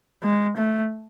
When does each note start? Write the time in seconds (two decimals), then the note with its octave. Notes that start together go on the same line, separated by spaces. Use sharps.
0.23 G#3
0.57 A3